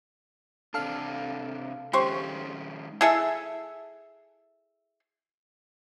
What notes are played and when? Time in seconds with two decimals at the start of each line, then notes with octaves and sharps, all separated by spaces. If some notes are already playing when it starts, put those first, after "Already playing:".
0.74 C3 D4 A4 F5
1.93 D#3 G#3 C#4 G4 C5 C#6
3.01 E4 G#4 A4 E5